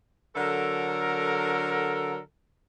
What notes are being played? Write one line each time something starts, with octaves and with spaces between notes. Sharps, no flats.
D3 F#3 A4 A#4